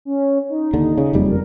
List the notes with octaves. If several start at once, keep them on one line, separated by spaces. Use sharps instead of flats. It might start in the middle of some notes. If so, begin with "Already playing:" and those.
C#4
D#4
D#2 D3
C#3
F#1 F2 G3
A#4